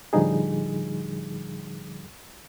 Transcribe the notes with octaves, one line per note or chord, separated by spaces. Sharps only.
A2 D3 F3 G3 D#4 G#4